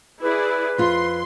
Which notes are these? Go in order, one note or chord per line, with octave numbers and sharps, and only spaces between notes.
E4 G#4 B4 D5
F2 F4 C6